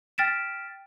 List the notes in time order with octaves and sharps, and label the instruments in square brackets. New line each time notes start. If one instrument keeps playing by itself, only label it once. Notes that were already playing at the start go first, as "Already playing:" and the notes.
[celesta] G5 F6 A6 B6 D7 E7